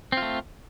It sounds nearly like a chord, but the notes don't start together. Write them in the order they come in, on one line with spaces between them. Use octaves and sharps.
C4 F4 A3